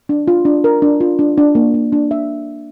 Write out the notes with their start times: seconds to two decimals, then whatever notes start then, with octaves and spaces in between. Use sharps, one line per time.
0.09 D4
0.28 F4
0.45 D4
0.64 A#4
0.82 D4
1.00 F4
1.19 D4
1.38 D4
1.55 A#3
1.74 A#3
1.93 D4
2.11 E5